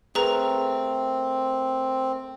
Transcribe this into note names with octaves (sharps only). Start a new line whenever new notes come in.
A3 C4 G#4 A#4 B4 A#5